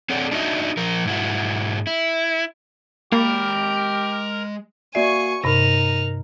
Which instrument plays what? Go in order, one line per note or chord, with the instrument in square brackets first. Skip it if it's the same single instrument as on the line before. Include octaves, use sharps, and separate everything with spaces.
[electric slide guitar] C4 A4 C#5 D5 F#5
D4 D#4 F#4 A4 D#5 E5
F3 A#4
G#2 E4 F#4
E4
[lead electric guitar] G#3 B5 [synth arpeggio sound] A#3 [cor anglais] G4 [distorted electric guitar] A#4
[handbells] A#3 F#4 C7 [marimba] D5 E5 [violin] G#5 C#6
[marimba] G2 C3 [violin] D#4 F7 [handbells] A#4 A#6